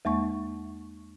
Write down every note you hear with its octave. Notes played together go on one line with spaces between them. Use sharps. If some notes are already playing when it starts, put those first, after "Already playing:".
E2 G#3 A#3 C#6